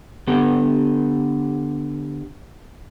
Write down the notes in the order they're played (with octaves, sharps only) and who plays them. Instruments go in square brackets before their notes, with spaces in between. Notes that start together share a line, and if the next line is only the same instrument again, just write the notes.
[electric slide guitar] D3 B3 G4 A4